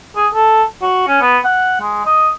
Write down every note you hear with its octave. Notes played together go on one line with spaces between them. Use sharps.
G#4
A4
F#4
C#4
B3
F#5
G#3
D#5